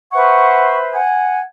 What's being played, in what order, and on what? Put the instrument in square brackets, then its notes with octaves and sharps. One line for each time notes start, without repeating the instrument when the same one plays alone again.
[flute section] B4 C5 E5 [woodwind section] F#5 C#6
[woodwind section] F#5 G#5